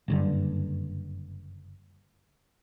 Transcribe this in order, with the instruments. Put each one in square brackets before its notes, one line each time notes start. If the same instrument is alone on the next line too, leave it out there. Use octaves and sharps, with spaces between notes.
[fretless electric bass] F#1 G2 D3